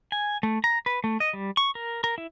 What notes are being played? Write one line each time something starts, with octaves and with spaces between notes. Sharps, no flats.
G#5
A3
A#5
B4
A3
D#5
G3
C#6
A#4
A#4
E4